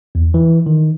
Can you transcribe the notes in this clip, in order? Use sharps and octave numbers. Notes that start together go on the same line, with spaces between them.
E2
E3
D#3